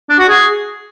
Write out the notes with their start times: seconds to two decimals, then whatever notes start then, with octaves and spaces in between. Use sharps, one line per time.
0.09 D4
0.19 F#4
0.28 G#4